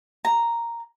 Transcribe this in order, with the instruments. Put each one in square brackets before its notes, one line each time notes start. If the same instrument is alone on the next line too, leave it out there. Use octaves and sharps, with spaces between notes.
[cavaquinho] A#5